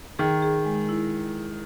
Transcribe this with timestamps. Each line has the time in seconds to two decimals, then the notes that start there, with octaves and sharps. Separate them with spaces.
0.19 D#3 G#4
0.42 G#4
0.65 G#3
0.89 E4